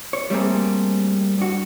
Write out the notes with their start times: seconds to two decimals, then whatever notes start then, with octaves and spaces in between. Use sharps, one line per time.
0.13 C#5
0.30 G3 A3 A#3 C4 G#4
1.38 G2 F#4